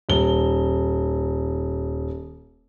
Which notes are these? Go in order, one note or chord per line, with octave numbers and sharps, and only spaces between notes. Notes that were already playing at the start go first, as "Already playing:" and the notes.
D#1 G7